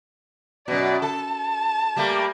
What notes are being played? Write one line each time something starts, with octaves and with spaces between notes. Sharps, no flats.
F#2 B2 D5
A4 A5
G3 A3 A#3